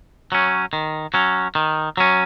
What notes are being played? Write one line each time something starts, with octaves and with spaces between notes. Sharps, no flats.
F#3 C#4
D#3
F#3 C#4
D#3
F#3 C#4